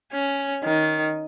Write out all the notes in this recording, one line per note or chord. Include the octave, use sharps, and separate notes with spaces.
C#4
D#3